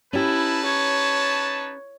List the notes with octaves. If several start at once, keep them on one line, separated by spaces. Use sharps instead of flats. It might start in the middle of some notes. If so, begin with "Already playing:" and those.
C#4 D#4 E4 G4 B4 A5
C#5